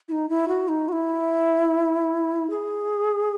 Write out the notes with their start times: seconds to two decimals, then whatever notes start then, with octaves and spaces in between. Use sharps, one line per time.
0.08 E4
0.12 D#4
0.29 E4
0.48 F#4
0.68 D#4
0.88 F#4
0.92 E4
2.50 G#4